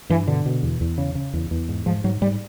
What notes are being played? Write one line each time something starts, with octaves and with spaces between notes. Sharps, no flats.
G2 E3
B2 D3
B2
E2
E2
C#3
C#3
E2
E2
G#2
G#2 F3
G#2 F#3
G#2 G3